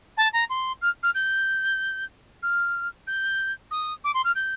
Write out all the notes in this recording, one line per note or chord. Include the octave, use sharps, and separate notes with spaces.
A5
A#5
C6
F6
F6
G6
F6
G6
D#6
D6
C6
F6
G6